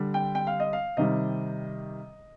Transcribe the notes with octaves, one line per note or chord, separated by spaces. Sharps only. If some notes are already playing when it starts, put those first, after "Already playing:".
Already playing: D3 G3
G5
G5
F5
D#5
F5
C3 D#3 G3 D#5